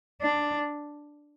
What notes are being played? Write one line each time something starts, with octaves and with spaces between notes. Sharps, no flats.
D4